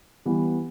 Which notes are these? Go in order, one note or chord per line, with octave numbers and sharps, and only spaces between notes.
E3 G3 B3